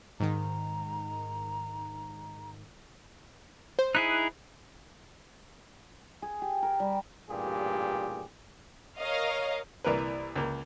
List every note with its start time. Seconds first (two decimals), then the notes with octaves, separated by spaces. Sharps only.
0.20 G#2 D#3 A#5
3.79 C5
3.95 D#4 E4 G#4 F#6
6.22 G#4
6.42 G4
6.62 A#4
6.80 G3
7.30 A1 G2 A#2 G4 G#4
8.98 A#4 C#5 D#5 F5
9.84 C2 E3 A#3 A#4 B4
10.36 C#2 A#3